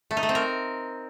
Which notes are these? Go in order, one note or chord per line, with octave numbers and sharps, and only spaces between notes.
A3
D#4
A3
C4
A#4